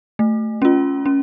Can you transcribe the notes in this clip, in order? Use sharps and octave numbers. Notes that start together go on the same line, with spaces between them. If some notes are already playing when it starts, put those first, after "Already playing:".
A3
C#4 F4
C#4